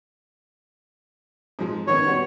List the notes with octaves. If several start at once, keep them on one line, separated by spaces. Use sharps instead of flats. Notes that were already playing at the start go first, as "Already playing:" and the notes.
G#2 F3 G#3
D#3 B3 C#4 C#5
G3 B3 F#4